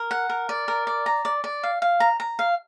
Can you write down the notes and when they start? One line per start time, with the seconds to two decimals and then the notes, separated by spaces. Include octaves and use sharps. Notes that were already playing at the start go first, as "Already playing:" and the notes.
Already playing: A#4
0.11 F#5
0.30 A#4
0.49 D5
0.68 A#4
0.87 D5
1.06 A#5
1.25 D5
1.44 D5
1.63 F5
1.82 F5
2.00 A#5
2.20 A#5
2.39 F5